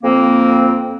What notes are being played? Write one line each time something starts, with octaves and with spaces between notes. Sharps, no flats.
F2 A#3 C4